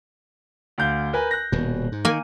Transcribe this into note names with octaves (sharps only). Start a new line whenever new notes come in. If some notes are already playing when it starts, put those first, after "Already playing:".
D2 F5 G6
A#4 B4 G#5
F#6 A#6
D#1 B2
G#2
D#3 A#3 G#5